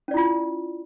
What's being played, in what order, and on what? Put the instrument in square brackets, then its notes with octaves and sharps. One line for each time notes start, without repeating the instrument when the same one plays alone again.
[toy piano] C#4
D5
E4
F4